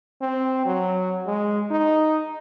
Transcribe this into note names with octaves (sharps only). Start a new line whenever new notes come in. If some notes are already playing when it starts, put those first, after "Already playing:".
C4
F#3
G#3
D#4